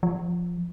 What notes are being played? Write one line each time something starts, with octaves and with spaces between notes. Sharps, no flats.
F3